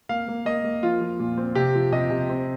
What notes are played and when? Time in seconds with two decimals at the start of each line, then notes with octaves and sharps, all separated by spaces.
0.09 A#3 F5
0.28 A#3
0.46 A#3 D#5
0.64 A#3
0.83 F3 F4
1.01 F3
1.19 A#2
1.38 C4
1.55 C3 G4
1.75 F3
1.92 C3 D#5
2.10 C3
2.29 C4